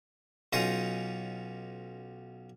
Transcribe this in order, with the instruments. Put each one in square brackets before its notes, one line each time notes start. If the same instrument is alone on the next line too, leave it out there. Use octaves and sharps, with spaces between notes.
[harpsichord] B1 C#4 D#4 F4 D#6